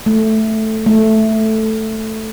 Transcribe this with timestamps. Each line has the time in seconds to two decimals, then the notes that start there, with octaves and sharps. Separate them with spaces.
0.06 A3
0.86 A3